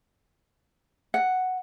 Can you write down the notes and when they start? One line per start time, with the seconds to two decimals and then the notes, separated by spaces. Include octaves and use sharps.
1.14 F#5